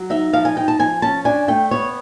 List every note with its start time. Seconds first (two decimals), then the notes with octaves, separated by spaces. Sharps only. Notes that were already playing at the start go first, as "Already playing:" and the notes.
Already playing: F#3
0.10 D#4 E5
0.33 F3 F5
0.45 G#5
0.56 D#4 G5
0.68 A5
0.79 F3 G#5
1.02 C#4 A5
1.25 D4 G#5
1.48 A3 G5
1.71 B3 C#5